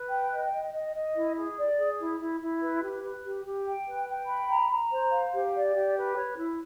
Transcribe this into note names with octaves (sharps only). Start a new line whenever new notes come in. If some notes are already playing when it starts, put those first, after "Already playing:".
Already playing: B4
G5
D#5
D#5
D#5
D#5
E4
G#4
D5
G#4
E4
E4
E4
B4
G4
B4
G4
G4
G5
B4
G5
B5
A#5
A#5
C5
F5
G4
D5
G4
B4
C#5
E4